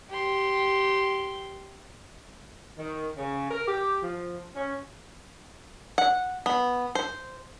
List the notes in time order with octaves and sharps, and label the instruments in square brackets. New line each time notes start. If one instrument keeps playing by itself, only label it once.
[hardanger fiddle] G4 C6
[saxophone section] D#3
C#3
A#4
G4
F3
C#4
[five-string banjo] F#5
B3
C5